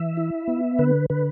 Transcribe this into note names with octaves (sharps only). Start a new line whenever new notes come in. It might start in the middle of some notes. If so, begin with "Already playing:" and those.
Already playing: E3 E5
E4
B3
D3 B4
D3 B4